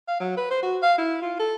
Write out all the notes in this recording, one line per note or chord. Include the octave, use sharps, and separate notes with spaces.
F5
F#3
B4
C5
F#4
F5
E4
F4
A4